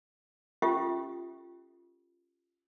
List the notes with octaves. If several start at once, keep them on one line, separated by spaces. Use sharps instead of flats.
C#4 F4 G4 A4 E5